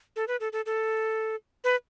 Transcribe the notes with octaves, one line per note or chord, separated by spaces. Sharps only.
A4
B4
A4
A4
A4
B4